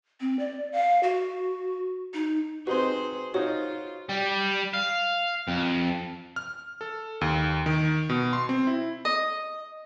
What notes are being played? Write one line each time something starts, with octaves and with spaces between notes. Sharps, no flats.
C4
D5
F5
F#4
D#4
C4 D#4 F#4 G#4 B4 C5 C6
D#4 F4 F#4 C5 C#5
G3
F5
F2
F6
A4
D#2
D#3
B2
C6
C4
E4
D#5